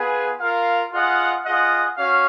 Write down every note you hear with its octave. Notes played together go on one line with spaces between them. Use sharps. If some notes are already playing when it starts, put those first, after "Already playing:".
Already playing: B3 F4 G#4 B4
F4 A#4 F5
F4 G#4 D#5 F#5
F4 G#4 D#5 F#5
C#4 F#4 C#5 F5